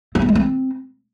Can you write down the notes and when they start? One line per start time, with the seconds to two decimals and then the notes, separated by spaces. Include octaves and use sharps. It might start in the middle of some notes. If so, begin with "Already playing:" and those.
0.15 C4
0.22 B3
0.29 G#3
0.35 C4